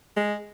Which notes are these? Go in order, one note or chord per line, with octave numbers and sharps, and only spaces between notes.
G#3